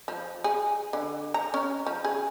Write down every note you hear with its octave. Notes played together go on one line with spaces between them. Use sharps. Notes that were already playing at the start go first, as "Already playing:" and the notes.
F3
G#4
D3
A#5
C#4
F3
G#4